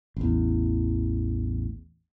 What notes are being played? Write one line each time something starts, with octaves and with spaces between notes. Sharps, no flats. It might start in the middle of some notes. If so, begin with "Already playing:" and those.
A1 E2